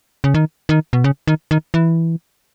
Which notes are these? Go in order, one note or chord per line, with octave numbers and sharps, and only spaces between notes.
C#3
D#3
D#3
B2
C#3
D#3
D#3
E3